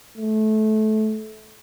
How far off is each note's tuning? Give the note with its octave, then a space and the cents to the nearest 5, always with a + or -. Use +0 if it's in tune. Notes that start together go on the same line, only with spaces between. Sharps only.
A3 -20